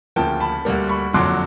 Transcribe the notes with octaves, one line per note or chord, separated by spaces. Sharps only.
D2 C#3 F3 A#3 G5 A5
A5 B5
D2 D3 G3 A#3
B5 C#6
F#1 F2 D3 F#3 C6 D6